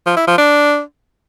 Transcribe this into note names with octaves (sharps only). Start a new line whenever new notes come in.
F3
E4
F3
D4